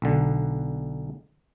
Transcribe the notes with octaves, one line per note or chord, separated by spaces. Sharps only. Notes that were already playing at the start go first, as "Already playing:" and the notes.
B1 D3